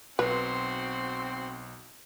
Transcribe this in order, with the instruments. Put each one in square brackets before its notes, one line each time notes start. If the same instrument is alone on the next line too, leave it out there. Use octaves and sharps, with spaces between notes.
[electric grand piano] B1 [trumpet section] C4 [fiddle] F#4 C6 [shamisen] B4